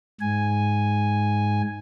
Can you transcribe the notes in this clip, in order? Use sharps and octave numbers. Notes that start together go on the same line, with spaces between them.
G#2 G#5